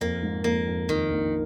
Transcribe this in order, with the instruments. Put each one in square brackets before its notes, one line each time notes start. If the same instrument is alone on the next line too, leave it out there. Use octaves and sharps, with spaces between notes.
[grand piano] F2 [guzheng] A#3
[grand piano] G#2
[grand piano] F2 [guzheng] A#3
[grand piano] F2
[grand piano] F2 [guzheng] D#3
[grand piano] A#1 A#2